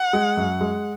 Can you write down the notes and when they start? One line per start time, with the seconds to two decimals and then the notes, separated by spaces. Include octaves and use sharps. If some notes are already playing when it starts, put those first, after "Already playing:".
Already playing: F#5
0.13 G#3
0.37 F#2
0.61 G#3